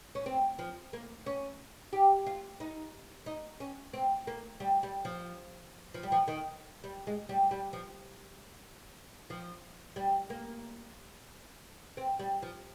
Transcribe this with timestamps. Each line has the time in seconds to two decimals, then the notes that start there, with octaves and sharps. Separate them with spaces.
0.15 C#4
0.26 C4
0.59 F3
0.93 A#3
1.26 C#4
1.93 G4
2.26 F4
2.60 D#4
3.26 D#4
3.60 C#4
3.93 C4
4.27 A#3
4.60 G3
4.83 G3
5.05 F3
5.94 F3
6.03 G3
6.12 F3
6.28 D#3
6.84 G3
7.07 G#3
7.29 G3
7.51 G3
7.73 F3
9.30 F3
9.96 G3
10.30 A#3
11.97 C4
12.19 G3
12.42 F3